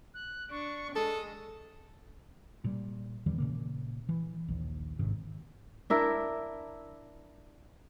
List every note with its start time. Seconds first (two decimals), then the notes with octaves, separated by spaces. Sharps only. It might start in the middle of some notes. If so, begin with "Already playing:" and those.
0.14 F#6
0.51 D4 C#6
0.96 G#3 A4 D#6
2.64 A#2 G3
3.26 E2 D#3 E3 G3
3.38 A#2 C#3 A#3
4.09 E3
4.48 A#1 D#2
4.99 G#1 G#2 C3 D#3
5.90 D4 E4 A#4